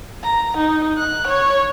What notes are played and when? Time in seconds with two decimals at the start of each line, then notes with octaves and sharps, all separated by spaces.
0.23 A#5
0.57 D#4
0.98 F#6
1.27 C#5